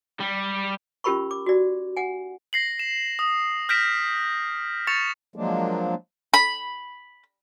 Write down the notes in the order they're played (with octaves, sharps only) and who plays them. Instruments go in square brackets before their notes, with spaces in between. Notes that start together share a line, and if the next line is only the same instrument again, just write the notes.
[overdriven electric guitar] G3
[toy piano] C#4 F4 G4 A#4 B5 C#6
D6
F#4 D5
F#5 G#5
[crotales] A#6 C7 F#7
E7
D#6
F6 G6 A#6 B6 D7 E7
C#6 A6 C#7 E7 F7
[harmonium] F3 F#3 G#3 A#3 D4
[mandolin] B5